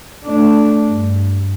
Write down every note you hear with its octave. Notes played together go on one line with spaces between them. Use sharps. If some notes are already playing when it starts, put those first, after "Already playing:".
A3 D4
G2